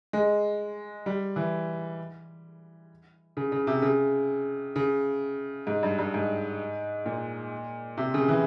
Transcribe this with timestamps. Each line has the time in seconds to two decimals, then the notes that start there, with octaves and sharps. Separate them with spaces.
0.13 G#3
1.06 G3
1.36 E3
3.37 C#3
3.52 C#3
3.67 C3
3.82 C#3
4.76 C#3
5.67 G#2
5.83 G2
5.98 G2
6.14 G#2
7.06 A#2
7.98 C3
8.14 C#3
8.28 E3